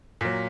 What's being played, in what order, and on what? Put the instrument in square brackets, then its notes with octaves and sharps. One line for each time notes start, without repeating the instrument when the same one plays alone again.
[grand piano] A#2 F#3